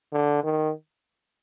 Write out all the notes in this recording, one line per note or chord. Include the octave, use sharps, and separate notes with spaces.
D3
D#3